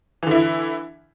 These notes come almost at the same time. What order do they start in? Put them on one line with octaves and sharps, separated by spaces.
E3 D3 E4